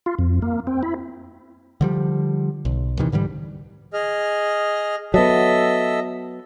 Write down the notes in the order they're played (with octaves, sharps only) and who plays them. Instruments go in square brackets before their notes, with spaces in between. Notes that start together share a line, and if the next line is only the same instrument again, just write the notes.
[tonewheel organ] F4
F2
A#3
C4
E4
[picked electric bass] D3 F3 G3
B1
D#2 C3 D#3 E3
G#2 D3 E3 G3
[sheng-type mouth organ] G#4 D#5 F6
[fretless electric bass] F#3 B3 [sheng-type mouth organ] A4 D#5 E5